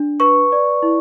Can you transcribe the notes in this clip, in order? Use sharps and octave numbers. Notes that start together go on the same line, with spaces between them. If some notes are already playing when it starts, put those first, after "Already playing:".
Already playing: D4
B4 C#6
D5
E4